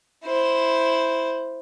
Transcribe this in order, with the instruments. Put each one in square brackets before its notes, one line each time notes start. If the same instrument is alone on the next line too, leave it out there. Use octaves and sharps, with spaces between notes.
[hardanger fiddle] E4 C5